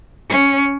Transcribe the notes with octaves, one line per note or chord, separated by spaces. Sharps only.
C#4